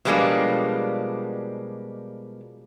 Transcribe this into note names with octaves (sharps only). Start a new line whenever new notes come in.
B2 F3 G3 G#3 A#3 D4